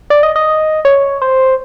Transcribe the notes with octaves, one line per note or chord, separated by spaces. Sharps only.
D5
D#5
D#5
C#5
C5